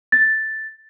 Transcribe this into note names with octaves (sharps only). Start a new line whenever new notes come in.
A6